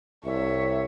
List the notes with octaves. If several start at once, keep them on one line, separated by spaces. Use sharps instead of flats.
C2 C#5 E5